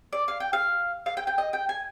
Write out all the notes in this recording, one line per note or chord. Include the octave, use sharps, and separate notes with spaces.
D5
F5
G5
F5
F5
G5
G5
D#5
G5
G#5